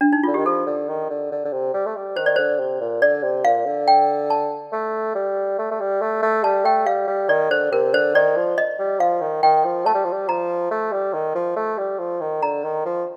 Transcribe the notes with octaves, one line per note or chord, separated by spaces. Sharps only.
D4
D#4
D3 F4
D#3 G4
F3 A4
D3
D#3
D3
D3
D3
C3
G3
A3
G3
D#3 C5
D5
D3 C5
C3
A#2
D3 D5
C3
A#2 F5
D3
G5
A5
A3
G3
A3
A3
G3
A3
A3
G3 A5
A3 G5
G3 F5
G3
D#3 D5
D3 C5
C3 A#4
D3 C5
D#3 D5
F3
D#5
G3
F3 F5
D#3
D#3 G5
F3
A3 A5
G3
F3
G3
F3 A#5
A3
G3
D#3
F3
A3
G3
F3
D#3
D3 A#5
D#3
F3